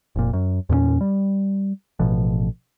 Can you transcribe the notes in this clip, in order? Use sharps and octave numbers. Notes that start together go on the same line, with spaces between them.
F1 A#2
F#2
E2 A#2 A3 C#4
G3
A1 B2 F3